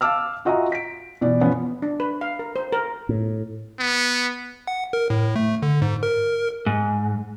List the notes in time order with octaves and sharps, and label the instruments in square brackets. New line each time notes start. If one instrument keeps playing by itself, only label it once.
[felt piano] F5 A5 D6 E6 F6
F4 F#4 D#5 E5 G#5 A#5
B6 D7
B2 E3 D5
F3 B3 C#4
[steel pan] D4
B4
F5
A#4
C5
A#4
[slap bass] A2
[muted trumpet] B3
[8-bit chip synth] F#5
A#4
A2
A3
D3
G#2
A#4
[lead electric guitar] G#2